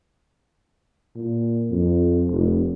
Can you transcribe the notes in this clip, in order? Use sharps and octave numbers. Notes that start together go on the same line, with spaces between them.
A#2
F2
F1